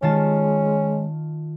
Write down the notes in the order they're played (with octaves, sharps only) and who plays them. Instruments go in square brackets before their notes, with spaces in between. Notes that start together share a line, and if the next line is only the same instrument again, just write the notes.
[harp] D#3 F4 A5 [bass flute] G#3 [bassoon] C#4